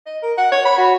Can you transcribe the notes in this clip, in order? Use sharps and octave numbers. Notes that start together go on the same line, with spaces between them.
D#5
A#4
F#5
C#5
B5
F#4